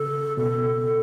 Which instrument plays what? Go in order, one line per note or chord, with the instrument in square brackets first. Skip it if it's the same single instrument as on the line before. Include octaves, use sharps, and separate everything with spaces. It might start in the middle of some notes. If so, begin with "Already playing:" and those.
Already playing: [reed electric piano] C#3 [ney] A4
[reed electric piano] B2 [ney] A4